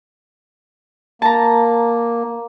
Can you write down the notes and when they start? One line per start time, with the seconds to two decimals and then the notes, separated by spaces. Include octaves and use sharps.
1.22 A#3 A5 A#5